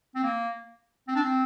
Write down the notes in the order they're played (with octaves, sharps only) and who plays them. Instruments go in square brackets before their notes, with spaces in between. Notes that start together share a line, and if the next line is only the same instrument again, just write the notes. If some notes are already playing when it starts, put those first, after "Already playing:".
[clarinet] C4
A#3
C4
D4
C4